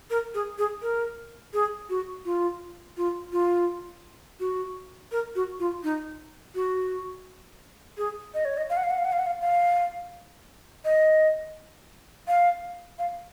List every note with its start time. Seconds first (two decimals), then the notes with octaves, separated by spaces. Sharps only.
0.10 A#4
0.34 G#4
0.58 G#4
0.82 A#4
1.54 G#4
1.90 F#4
2.25 F4
2.97 F4
3.32 F4
4.40 F#4
5.12 A#4
5.36 F#4
5.60 F4
5.84 D#4
6.55 F#4
7.97 G#4
8.34 D#5
8.45 C#5
8.57 D#5
8.70 F5
8.77 F#5
8.83 F5
8.90 F#5
8.98 F5
9.05 F#5
9.12 F5
9.19 F#5
9.26 F5
9.41 F5
10.85 D#5
12.28 F5
12.99 F5